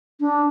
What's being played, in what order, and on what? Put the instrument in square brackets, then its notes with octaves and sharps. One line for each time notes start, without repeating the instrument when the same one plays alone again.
[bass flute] D4